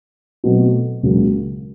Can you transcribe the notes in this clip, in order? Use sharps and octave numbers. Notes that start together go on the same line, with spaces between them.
B2 F#3 A3 C4
C#2 C#3 F#3 A#3